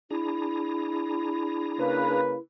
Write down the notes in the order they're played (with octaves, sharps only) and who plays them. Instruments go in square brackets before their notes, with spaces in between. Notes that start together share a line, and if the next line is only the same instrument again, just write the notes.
[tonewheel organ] D4 G#4 A#5 [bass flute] E4
[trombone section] C#3 A#3 B4